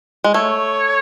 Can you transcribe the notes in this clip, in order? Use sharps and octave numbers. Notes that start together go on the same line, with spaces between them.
G#3
A3 C#5